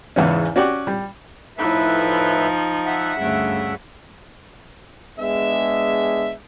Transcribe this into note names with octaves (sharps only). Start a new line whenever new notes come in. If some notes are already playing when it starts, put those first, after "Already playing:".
E2 G#2 C#3 E3 B3 C#4
C#4 F#4 G4 D5 F#5 G5
G3
A2 F3 D#4 B4 E5
E5 F#5
D2 G2 C#3
G#3 B3 D4 G#4 E5